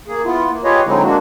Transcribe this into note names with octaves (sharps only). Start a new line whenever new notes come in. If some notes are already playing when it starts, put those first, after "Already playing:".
A#3 G#4
B3 E4 F4
A#3
F4 G4 G#4 B4 C#5 D#5
D3 F#3 G#3 C4 D#4 E4
G#3 A#3 D4 F#4